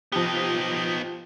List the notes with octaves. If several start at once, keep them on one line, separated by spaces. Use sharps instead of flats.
F3 B3 D#4 G4